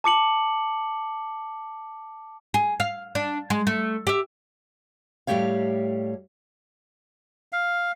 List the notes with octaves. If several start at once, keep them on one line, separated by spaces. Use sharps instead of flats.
A5 D6 C#7 F#7
G#4
F5
D4
G#3
A3
G4 E5
A2 G3 A3 G4 C#5 F5
F5